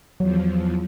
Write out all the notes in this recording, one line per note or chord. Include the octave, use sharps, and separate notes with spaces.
E2 F3 F#3